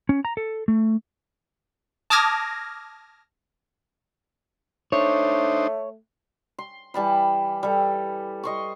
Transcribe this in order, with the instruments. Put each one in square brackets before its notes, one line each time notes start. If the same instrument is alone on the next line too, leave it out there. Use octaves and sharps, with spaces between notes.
[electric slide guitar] C#4
A#5
A4
A3
[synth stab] A5 D6 D#6 F6 G#6 A#6
[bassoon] A3 [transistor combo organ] D4 D#4 C5 [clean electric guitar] C#5
[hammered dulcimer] C6
E3 G3 A5 B5
G3 A4
D#5 C6 C#6